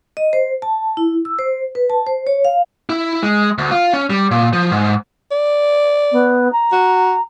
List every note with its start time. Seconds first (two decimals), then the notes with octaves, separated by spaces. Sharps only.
0.17 D#5
0.33 C5
0.62 A5
0.97 E4
1.25 E6
1.39 C5
1.75 B4
1.90 A5
2.07 C5
2.27 C#5
2.45 F5
2.89 E4
3.22 G#3
3.58 D2
3.71 F4
3.93 C#4
4.10 G3
4.31 A#2
4.53 F3
4.71 G#2
5.31 D5
6.12 B3
6.52 A#5
6.72 F#4